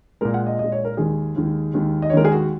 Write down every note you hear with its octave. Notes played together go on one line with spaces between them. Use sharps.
A#2 G#3 A#4
F#5
D#5
A#2 G#3 D#5
C#5
A#4
D#2 D#3 G#3 G#4
D#2 D#3 G#3
D#2 D#3 G#3
D#5
C#5
D#2 D#3 G#3 A#4
G#4
F#4